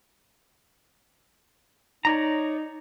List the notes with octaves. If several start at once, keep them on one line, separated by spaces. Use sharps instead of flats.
D#4 C#5 D5 A#5